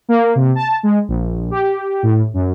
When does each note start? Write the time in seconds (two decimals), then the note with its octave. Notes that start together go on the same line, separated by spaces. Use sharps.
0.09 A#3
0.35 C3
0.55 A5
0.83 G#3
1.08 A#1
1.51 G4
2.03 A2
2.34 F#2